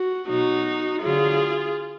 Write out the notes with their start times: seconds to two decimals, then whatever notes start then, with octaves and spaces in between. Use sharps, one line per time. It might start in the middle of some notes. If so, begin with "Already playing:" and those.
Already playing: F#4
0.29 B2 F#3 D#4 F#4
1.03 D3 F#3 F4 G#4